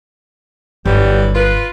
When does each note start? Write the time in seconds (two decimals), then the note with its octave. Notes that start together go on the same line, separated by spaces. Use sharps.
0.85 G1 E3 F#3 G3
1.34 F4 B4